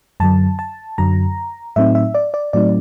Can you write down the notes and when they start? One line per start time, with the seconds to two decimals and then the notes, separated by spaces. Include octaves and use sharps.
0.20 F#2 D3 F#3 A5
0.59 A5
0.98 F#2 D3 F#3 A#5
1.76 A2 F#3 A3 C4 D#4 E5
1.95 E5
2.14 D5
2.34 D5
2.53 A2 F#3 A3 C4 D#4 D5